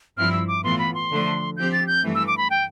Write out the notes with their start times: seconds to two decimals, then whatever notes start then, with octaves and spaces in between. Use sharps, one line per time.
0.17 G2 F3 C4 E4 F6
0.32 E6
0.47 D6
0.64 A2 E3 B3 F4 C6
0.79 B5
0.95 C6
1.10 D3 F3 A3 D4
1.57 F3 C4 G4 G6
1.72 A6
1.87 G6
2.03 G2 E3 A3
2.15 E6
2.27 D6
2.38 B5
2.50 G5